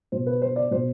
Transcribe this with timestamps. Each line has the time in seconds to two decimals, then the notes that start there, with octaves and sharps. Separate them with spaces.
0.12 B2 C5
0.26 B4
0.42 C5
0.56 D5
0.71 B2 C5